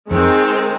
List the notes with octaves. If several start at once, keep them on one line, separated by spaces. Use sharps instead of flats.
F2 D#3 G#3 C4